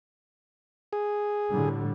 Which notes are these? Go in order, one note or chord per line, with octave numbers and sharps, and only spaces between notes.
G#4
A2 D3 G3